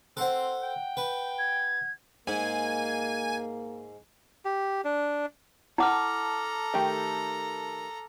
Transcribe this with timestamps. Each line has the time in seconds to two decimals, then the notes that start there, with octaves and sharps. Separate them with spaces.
0.17 C4 A4 C5 F#5 F#6
0.63 G5
0.97 B4
1.38 G#6
2.27 G#2 A#3 G#5
4.45 G4
4.84 D4
5.78 E4 A4 F#5 A5 A#5 D6 F6
6.74 D#3 A3 G4